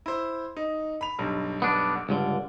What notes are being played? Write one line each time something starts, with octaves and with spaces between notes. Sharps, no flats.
E4 C5
D#4
B5 F7
B1 G2
B3 D4
C#2 G2 D3